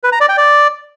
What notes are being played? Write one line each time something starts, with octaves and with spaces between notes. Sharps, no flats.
B4
A#5
D5
G5
D5